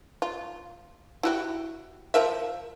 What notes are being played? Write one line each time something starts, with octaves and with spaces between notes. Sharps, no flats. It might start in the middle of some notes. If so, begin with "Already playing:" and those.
F4
E4 F#4 G4
F3 A#4 E5